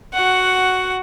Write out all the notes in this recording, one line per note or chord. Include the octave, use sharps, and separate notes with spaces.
F#4 F#5